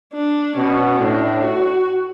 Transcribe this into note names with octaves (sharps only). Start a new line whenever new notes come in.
D4
B2 C#4
A2 D4
F#4